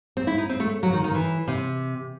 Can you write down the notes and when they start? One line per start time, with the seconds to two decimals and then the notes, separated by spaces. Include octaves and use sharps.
0.17 C4
0.27 E4
0.38 D#4
0.49 C4
0.60 A3
0.83 F#3
0.93 D#3
1.04 D#3
1.14 E3
1.48 C3